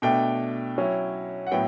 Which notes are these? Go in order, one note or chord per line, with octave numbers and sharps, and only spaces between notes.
B2 A3 D4 G5
F#3 C#4 E4
F#5
A2 F#3 B3 E4 G5